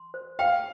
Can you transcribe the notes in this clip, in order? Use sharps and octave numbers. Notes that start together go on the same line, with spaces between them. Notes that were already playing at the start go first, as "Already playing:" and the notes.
Already playing: C6
C5
F5 G5